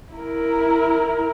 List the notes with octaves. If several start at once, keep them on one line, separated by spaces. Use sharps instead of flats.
E4 A#4